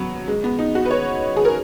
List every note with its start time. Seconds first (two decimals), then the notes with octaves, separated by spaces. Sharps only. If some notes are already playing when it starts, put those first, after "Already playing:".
Already playing: F#3 B3
0.28 G#3
0.44 B3
0.59 D#4
0.75 F#4
0.85 B4
0.91 C#5
1.36 G#4
1.45 A#4